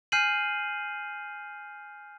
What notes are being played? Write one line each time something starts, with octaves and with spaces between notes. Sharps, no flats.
G#5 F6 G6 C7 D#7 F#7